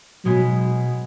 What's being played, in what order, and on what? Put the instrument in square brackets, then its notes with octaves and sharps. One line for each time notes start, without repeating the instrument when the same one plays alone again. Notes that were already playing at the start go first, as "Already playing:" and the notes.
[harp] B2 G#3 B3 [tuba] F#3